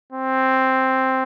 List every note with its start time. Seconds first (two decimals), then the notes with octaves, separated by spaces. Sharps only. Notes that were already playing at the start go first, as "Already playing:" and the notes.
0.12 C4